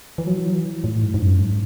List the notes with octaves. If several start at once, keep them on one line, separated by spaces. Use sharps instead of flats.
E3
F#3
E3
A2
G#2
G#2
F#2
G#2